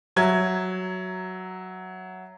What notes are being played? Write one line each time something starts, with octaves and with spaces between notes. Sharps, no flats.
F#3 E5 G#6